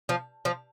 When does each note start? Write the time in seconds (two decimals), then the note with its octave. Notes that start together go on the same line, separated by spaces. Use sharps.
0.09 F3
0.45 F3